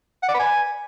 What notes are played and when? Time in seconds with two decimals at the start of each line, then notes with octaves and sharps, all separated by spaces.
0.23 F#5
0.28 D5
0.34 B4
0.40 G#5